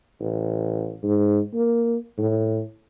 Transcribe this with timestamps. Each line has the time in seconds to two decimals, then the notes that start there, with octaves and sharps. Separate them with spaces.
0.20 A1
1.03 G#2
1.54 A#3
2.18 A2